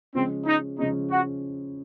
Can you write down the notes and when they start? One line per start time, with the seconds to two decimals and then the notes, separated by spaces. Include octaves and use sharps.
0.14 C#3 F3 G#3 C4 C#4
0.46 D#4
0.78 C#3 F3 G#3 C#4 D#4
1.11 F#4